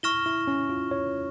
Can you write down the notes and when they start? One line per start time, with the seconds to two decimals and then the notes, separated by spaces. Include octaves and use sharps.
0.03 E4 C#6 F6 A#6 E7 G7
0.26 E4
0.47 C#4
0.70 F4
0.91 C#5